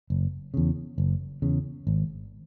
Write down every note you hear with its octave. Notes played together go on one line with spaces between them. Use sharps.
F#1
E2 C#3
F#1
E2 C#3
G#1